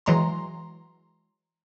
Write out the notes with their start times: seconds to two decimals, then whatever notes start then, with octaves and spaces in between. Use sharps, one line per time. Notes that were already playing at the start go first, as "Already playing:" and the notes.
0.06 E3 F#3 G#3 A#5 C6